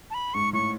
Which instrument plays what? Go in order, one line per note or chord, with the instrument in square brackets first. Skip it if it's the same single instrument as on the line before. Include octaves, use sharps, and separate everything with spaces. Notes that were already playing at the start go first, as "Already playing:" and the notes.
[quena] A5
B5
[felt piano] G#2 [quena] C#6
[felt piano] A2 [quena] C#6